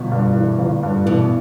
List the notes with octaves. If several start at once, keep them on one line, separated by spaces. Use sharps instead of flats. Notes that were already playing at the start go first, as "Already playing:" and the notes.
Already playing: G1 B2
G2
E3
G1
G2
B2 E3